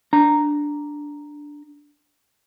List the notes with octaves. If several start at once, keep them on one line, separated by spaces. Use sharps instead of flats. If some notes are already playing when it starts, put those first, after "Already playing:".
D4 A#5